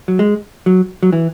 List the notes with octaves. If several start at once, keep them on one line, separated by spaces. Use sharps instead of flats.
F#3
G#3
F#3
F#3
E3